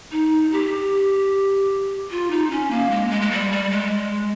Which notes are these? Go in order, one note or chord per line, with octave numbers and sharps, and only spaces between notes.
D#4
G4
F4
D#4
C#4
A#3
G#3
G#3
G#3
G3
G3
G#3